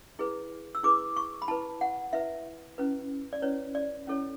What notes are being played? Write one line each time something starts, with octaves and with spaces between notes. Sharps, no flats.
E4 G#4 B4
E6
E4 G#4 B4 D6
C#6
B5
E4 B4 A5
F#5
E4 B4 E5
C#4 E4 B4
D5
C#4 E4 B4 C#5
D5
C#4 E4 A4 C#5